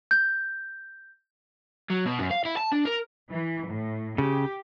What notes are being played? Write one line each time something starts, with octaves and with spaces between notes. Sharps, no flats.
G6
F#3
B2
F#2
F5
E4
A5
D4
A#4
E3
A2
C#3 G4